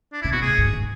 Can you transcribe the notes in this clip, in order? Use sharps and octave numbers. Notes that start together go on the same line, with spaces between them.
D4
C#3 E4
B2 F#4
A2 G#4
G#2
E3